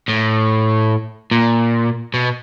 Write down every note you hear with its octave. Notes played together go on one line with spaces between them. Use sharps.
A2
A#2
B2